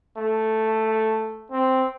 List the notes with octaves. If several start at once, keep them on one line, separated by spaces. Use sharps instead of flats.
A3
C4